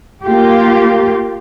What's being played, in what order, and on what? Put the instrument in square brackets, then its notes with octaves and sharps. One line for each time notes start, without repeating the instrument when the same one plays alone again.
[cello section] A#3 F4 G4